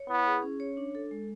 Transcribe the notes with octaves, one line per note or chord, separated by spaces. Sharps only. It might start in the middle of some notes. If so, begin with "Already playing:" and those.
Already playing: C#5
B3 E4
G#4
C#4
C#5
D4
A4
G#3